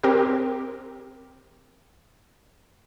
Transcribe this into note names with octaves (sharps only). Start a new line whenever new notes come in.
C4 G4 A#4